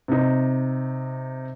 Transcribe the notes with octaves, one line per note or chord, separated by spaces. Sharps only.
C3 D#4